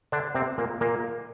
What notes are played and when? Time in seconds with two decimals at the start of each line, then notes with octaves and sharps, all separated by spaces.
0.12 D3 D4
0.35 C3 C4
0.58 A#2 A#3
0.81 A#2 A#3